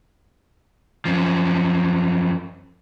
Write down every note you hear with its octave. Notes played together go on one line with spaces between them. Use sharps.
F#2 F3